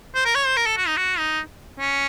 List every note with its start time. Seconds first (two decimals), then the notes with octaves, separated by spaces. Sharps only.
0.15 C5
0.25 A#4
0.35 C#5
0.47 C5
0.57 A#4
0.66 A4
0.77 F#4
0.87 D#4
0.97 F#4
1.18 D#4
1.80 C#4